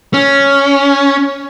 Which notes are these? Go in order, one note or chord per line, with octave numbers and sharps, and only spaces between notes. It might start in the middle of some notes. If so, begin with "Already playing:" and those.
C#4